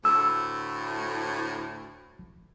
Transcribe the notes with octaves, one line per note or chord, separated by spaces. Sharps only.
D2 A2 E6